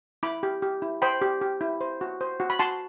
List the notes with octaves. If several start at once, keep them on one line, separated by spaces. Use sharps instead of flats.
E4 B5 D6
G4
G4
E4
C5 G5 B5
G4
G4
E4
C5
F#4
C5
F#4
B5
F#4 A5 C6